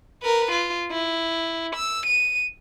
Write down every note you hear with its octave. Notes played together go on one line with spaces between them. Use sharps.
A#4 B4
F4
E4
E6
D#7